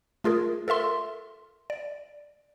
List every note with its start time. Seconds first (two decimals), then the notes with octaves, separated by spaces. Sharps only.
0.24 A3 F4 G#4 A#4
0.68 A4 A#4 E5 C6
1.70 D5